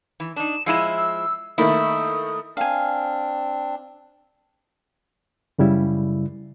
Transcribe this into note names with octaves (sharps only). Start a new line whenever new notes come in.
E3
D4 D#4 E7
F3 G#3 E4 E6 C7 D#7 E7
E6
D#3 A3 A#3 E4 D#6
C4 D4 F5 G#5
F#2 C#3 G3 E4